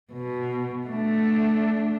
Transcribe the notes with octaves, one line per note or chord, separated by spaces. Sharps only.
B2
A3 D4